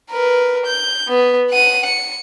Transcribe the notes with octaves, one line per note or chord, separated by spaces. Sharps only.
A#4 B4
G6
B3
F#5 D#7
C#7